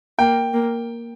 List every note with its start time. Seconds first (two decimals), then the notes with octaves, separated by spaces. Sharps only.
0.19 A#3 G5
0.54 A#3